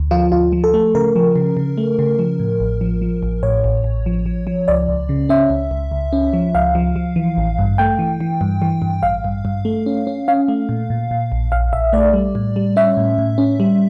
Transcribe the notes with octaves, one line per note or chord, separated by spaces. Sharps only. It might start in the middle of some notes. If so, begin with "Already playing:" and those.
Already playing: D2
F3 F4
D2 F4
F3
A4
A3
C#3 A#4
F3
C#3
C#3
A3
C#3
F3
A2
A1
F3
F3
A1
A2 C#5
A1
A1
F3
F3
F3
C#2 D5
C#2
C#3
C#4 E5
C#2
C#2
C#2
C#4
F3
C#2 F5
F3
F3
E3
A1
G2
A3 G5
E3
E3
G2
E3
G2
A1 F5
G2
G2
A3
C#4
C#4
C#4 F5
A3
A#2
A#2
A#2
A#1
A#1 F5
A#1 E5
A3 D5
G3
A2
G3
C#4 E5
A2
A2
C#4
G3